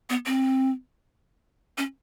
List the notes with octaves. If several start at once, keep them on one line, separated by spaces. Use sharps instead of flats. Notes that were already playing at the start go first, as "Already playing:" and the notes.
B3
C4
C#4